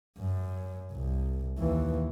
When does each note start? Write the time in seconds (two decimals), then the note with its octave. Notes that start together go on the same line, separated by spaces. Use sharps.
0.18 F#2
0.92 C2
1.58 D#2 E3